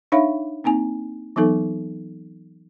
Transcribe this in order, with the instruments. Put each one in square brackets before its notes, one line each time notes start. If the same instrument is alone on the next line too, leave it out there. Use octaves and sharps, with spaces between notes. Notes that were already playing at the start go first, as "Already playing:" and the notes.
[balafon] D4 D#4 C#5 E5 F5 B5
A#3 C4 D#4 G#5
E3 F#3 B3 D#4 A4